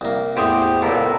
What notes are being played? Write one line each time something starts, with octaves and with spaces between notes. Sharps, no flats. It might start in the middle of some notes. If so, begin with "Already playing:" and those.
C2 A#3
A1 E2 G4 G#4 C5
C#2 A#2 B3 A4 A#4